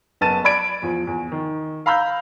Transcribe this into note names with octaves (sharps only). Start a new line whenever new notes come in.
F#1 B3 A5 A6 D#7 E7
D5 B5 G#6 D7
E2 F3
E2
D#3
F5 A#5 B5 E6 G6